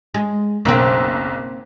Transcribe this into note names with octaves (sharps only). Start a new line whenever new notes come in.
G#3
F#1 B1 A#3 C4